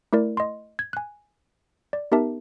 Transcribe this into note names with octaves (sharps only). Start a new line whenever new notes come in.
A3 E4 A#4 D5
D#5 C6
G#6
G#5 F#6
D5
B3 D#4 G4 A#4 E5 A5